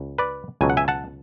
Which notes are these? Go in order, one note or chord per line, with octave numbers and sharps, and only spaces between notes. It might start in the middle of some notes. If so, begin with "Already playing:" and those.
Already playing: C#2
B4 D5
C#2 B2 F#3 G#5
F#5
E5 G#5
F#5 A5